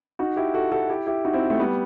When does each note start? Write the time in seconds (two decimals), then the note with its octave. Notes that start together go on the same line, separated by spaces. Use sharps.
0.19 D#4 F#4
0.36 E4 G4
0.54 F#4 A4
0.72 F#4 A4
0.89 E4 G4
1.07 E4 G4
1.25 D#4 F#4
1.33 C4 E4
1.50 A3 C4
1.59 G3 B3